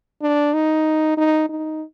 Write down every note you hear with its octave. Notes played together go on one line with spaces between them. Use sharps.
D4
D#4
D#4
D#4